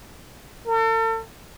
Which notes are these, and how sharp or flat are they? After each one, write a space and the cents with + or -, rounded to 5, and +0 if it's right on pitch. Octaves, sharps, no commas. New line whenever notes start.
A4 +40